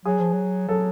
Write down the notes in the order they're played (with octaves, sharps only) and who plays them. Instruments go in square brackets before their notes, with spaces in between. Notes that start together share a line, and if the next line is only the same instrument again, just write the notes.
[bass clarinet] F#3 [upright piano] G#4
[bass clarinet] F3
F#3
[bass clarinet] F#3 [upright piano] A4